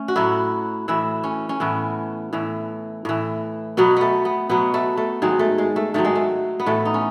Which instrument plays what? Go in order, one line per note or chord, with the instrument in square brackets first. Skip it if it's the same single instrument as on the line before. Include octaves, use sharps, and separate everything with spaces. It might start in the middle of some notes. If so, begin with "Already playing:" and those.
Already playing: [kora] A3 C#4
F#4
A2 F#3 E4
A2 E3 E4
C#4
C#4
A2 E3 B3
A2 E3
A2 E3
B2 F#3 B3
A3 B3
B3
B2 F#3 B3
A3
A3
G#2 D#3 F#3 G#3
A3
G#3
A3
G#2 D#3 F#3 A3
G#3
A3
B3
A2 E3 A3
D#4
C#4